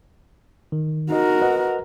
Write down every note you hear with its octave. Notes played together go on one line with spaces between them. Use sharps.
D#3
D#4 F#4 A#4 D#5
B4 D#5 F#5